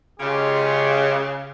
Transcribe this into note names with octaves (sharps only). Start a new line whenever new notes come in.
C#3 G#3 F4 G4